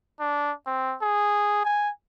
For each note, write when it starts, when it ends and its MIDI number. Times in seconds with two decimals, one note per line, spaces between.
0.20 0.52 62
0.67 0.96 60
1.02 1.62 68
1.65 1.91 80